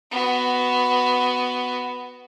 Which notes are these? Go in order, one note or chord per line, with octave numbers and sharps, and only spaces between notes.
B3 F#4